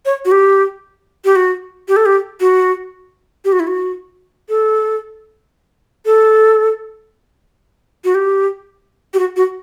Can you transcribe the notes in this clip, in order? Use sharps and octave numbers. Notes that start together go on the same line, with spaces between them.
C#5
F#4
G4
G4
F#4
G4
A4
G4
F#4
G4
F#4
E4
F#4
A4
A4
F#4
G4
G4
F#4
F#4